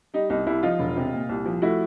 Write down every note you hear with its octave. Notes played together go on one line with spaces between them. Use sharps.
G3 D#4
C2 D#4
C2 E4
F3 D#4 F4
E1
C3
A#2
C2
F3
A3 E4 F#4